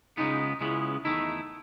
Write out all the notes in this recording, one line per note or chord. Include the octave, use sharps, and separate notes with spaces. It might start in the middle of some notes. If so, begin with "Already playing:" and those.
C#2 C#3 G#3 B3 D#4
C#2 C#3 G#3 B3 E4
E2 D#3 A3 D#4 E4